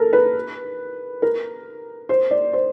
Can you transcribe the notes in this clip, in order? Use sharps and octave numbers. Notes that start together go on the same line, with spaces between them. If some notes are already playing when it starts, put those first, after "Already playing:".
Already playing: A4 A#4
B4
A#4
C5
D5
C5